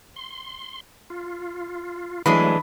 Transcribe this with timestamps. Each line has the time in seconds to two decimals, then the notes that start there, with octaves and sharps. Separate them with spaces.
0.16 C6
1.10 F4
2.26 E3 F#3 G#3 A3 D4 B5